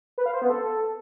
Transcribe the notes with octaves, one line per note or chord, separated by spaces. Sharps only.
B4
F5
C5
B3
A4